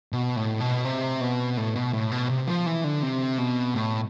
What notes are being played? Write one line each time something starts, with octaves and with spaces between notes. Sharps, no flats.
B2
A2
B2
C3
B2
A2
B2
A2
B2
C3
F3
E3
D3
C3
B2
A2